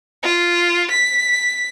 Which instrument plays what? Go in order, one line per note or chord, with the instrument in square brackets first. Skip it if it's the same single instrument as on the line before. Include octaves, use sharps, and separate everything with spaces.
[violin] F4
B6